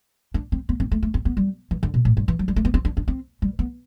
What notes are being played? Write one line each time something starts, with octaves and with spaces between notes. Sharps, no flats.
D4
C4
B3
C4
A3
A3
C4
B3
G3
E3
D3
B2
A2
G2
E3
F#3
G3
A3
B3
C4
D4
D4
C4
G3
B3